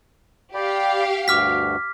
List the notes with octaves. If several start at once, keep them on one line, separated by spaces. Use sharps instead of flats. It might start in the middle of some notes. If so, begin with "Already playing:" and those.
G4 D5 F5 G5 B5
D2 G2 F#4 D6 F6 B6